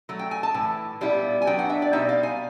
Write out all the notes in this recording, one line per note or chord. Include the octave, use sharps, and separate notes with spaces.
F#3 A3
G5
G#5
A5
A2 E3
A#2 G3 B3 E4
G#5
F#3 B3 D4 G5
F#5
E5
D5
B2 G3 C4 D#4 E5
F5
G#5